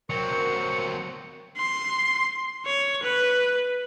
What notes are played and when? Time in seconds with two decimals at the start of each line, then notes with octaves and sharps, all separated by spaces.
0.10 F#3 C4 A#4 C#6
1.57 C6
2.65 C#5
3.03 B4